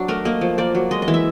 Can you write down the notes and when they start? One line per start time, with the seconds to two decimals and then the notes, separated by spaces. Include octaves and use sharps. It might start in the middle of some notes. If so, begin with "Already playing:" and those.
Already playing: F#3 D4
0.08 A3 A#4
0.25 A#3 D#5
0.41 F3
0.58 A#3 D5
0.75 F#3
0.91 G#3 D#5
1.02 D#5
1.08 E3
1.14 E5